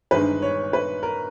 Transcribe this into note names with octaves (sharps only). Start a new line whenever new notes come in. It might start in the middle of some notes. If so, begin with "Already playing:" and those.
G1 G2 D#3 G#3 B4
C#5
B4
A#4